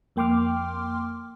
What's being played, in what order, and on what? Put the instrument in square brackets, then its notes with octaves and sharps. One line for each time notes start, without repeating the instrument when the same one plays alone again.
[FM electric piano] F2 A#3 G5 C6 D6 F6